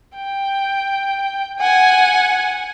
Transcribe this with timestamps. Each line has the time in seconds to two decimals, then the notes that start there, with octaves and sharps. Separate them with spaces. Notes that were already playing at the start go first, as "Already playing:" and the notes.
0.16 G5
1.59 F#5 G#5